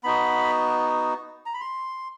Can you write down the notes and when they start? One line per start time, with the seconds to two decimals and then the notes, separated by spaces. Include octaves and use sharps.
0.04 B3 D#4 F#4 B5
1.46 A#5
1.54 B5
1.61 C6